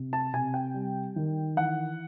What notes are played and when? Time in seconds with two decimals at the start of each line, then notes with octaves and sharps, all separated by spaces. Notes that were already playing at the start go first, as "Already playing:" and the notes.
Already playing: C3
0.13 A5
0.34 C3 G#5
0.54 G5
0.74 G3
1.16 D#3
1.57 E3 F#5